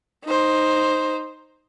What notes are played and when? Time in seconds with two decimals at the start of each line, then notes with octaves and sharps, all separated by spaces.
0.25 D#4 C5